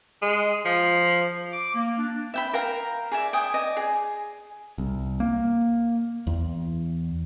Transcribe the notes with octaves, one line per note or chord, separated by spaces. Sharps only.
G#3
F3
D6
A#3
D4
E5 G5 B5
A#4 F5 G5 A#5
G#4 D5 E5
G5 G#5 D#6
D5 D#5
G#4
C2
A#3
E2